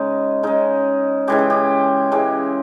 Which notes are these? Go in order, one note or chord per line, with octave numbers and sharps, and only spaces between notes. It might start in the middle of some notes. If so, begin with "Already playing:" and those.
Already playing: C#3 G#3 D#4
C#3 G#3 D#4
C#3 E3 G#3 G4
G#4
G4
C#3 E3 G#3 G4